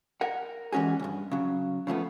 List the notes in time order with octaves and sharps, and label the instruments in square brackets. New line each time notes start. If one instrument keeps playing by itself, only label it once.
[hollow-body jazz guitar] A#4 F#5
E3 G#3 C#4 F#4 G#4
C#2 G2
C#3 F#3
C#3 F3 A3 B3